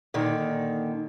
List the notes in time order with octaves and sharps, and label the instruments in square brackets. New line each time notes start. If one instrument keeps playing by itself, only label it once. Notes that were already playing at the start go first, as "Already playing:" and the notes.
[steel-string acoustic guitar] A#2 D3 D#3